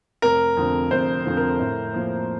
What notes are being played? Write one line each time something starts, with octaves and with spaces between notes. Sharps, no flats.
F1 A#4
F2 D3 F3
F1 C5
F2 D3 F3
A#4
A2
F3 A#3